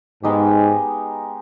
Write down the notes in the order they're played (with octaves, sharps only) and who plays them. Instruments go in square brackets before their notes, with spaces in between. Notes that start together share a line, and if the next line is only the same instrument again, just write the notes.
[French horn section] G#2 [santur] G#3 B3 D#4 G4